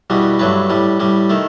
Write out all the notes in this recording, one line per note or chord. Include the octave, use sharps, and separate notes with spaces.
E2 B2 G3
G2 F#3 A3 B4
A2 G3
A2 G3
D#3 A3